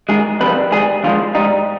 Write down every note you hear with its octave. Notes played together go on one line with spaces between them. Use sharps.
G#2 D#3 G#3 G#4
F2 C3 D#3 G3 B4
G#2 D#3 G3 G#4
D#2 D3 F3 G#3 F4
G#2 G3 D#4